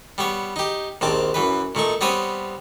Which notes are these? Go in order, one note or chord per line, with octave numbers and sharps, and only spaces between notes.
G3 B3 C#5
D#4 G4
A#1 D#2 C4 A5 D6
F#2 E3 B4
A#2 A3 D#4 C#6
G3 B3 C4 C#5 B5 D#6